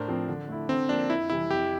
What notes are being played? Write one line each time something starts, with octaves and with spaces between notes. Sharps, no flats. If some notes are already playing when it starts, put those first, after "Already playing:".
Already playing: A2 D4 A#4 C5
F3 C4
D3
A3 E4
D3 C4
F3 A#3 D4
F2 E4
C3 E3 G3 E4
F2 G4